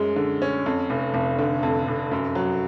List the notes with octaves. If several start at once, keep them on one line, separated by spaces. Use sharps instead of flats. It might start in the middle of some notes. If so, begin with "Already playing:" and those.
Already playing: F#2 G#3 C#4
D3
C#4
F2
F1
F1
D3
F2
F1
F#2
F#3